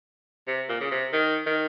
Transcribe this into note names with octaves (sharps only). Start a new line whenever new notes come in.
C3
A#2
C#3
C3
D#3
D#3